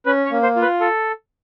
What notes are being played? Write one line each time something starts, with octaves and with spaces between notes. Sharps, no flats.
C#4 B4
C#5
A#3
C5
F4
B4
A4